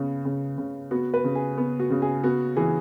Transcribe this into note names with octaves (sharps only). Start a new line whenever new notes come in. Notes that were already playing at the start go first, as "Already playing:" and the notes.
Already playing: C#3 B3
C#3
C#3
B3 F#4
B4
C#3
G#4
B3
F#4
C#3
G#4
B3 F#4
E3 G#4